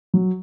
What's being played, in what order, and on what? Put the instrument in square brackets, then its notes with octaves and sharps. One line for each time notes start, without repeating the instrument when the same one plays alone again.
[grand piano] F#3